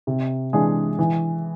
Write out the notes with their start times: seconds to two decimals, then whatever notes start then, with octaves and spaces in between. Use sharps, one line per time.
0.07 C3
0.53 E3 G#3 D4 G#4
0.99 E3